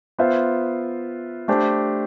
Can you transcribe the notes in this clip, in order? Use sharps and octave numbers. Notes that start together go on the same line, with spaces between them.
B3 F4 C5 E5
A3 D4 G4 C5